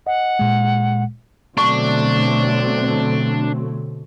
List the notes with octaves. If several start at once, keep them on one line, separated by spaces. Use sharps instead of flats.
D#5 F#5
A#2 G#3
B2 D3 F#3 A3 C4 D4 C#6